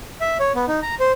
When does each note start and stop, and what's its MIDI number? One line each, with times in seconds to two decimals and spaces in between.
0.21 0.38 76
0.40 0.52 73
0.55 0.65 59
0.68 0.80 63
0.82 0.95 82
1.00 1.12 72